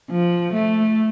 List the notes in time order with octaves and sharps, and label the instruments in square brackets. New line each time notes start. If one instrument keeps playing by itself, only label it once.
[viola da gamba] F3
A3